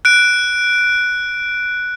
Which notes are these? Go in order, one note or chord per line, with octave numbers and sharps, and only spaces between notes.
F#6 D7